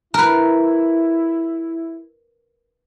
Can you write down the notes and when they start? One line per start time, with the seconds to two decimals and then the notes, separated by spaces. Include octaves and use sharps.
0.14 E4 A#4 B4